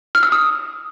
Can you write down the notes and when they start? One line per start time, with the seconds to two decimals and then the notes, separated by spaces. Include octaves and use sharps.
0.15 F6
0.23 E6
0.32 D#6